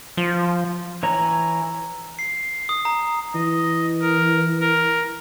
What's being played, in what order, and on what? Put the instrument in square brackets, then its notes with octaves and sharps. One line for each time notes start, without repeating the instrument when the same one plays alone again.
[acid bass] F3
[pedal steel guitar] E3 C#5 A#5
[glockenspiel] C7
D#6
A#5
[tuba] E3 [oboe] D#5
[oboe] A#4
A#4